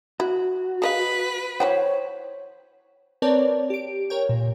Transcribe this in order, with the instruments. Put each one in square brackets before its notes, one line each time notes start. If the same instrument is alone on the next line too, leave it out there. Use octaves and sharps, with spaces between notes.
[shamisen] E4 [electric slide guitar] F#4
[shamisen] G#4 D#5 F5 [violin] B4
[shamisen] E3 F#4 G5 [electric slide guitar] C5 [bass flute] C#5
[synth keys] C4 A#4 B4 C#5 D5 A5
G4 D7
A#4 C#5 G5
A#2